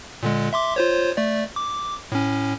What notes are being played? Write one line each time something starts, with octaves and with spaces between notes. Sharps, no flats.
A#2 D3 G#3
E5 C6 D6
F4 C5 C#5
A3 D5
D6
A2 C#4